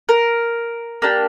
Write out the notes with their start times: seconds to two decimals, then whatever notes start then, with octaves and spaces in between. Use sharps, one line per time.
0.09 A#4
1.02 A#3 D4 G4